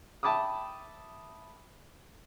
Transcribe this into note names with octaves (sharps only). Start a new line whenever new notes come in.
E5 G5 A5 B5 D6 D#6